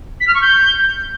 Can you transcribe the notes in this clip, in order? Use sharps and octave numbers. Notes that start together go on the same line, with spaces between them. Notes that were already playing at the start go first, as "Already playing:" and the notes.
B6
F6
C#6
G6